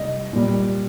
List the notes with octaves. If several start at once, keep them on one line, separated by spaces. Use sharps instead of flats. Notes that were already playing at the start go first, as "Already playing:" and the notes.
Already playing: C3 G3 D#5
A#2 G3